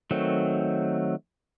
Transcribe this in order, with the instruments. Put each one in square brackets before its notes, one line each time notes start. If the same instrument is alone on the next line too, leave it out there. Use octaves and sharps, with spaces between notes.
[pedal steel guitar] D#3 F#3 A3 C4